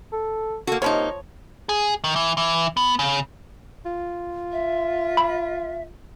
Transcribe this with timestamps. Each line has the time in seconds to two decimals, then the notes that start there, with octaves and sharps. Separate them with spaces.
0.12 A4
0.67 A#3 F#4 A4
0.82 C3 F3 A#3 D#4 C#5
1.69 G#4
2.04 D#3
2.16 E3
2.38 E3
2.77 B3
2.99 C#3
3.85 F4
4.52 E5
5.17 B5